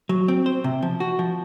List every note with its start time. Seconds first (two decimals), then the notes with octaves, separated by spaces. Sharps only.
0.09 F#3
0.28 C4
0.46 C5
0.64 C3
0.82 F3
1.00 F#4
1.19 F3